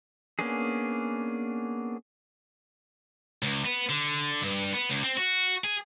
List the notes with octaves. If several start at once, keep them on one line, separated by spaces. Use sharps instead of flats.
A#3 B3 C#4 D4 G#4
C#2
B3
D3
G2
B3
C#2
C4
F#4
G#4